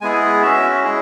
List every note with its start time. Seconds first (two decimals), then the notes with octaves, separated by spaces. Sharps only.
0.01 G#3 B3 E4 G#4 G#5
0.42 C#4 F#4 E5
0.84 G#3 C#4 E4 G#4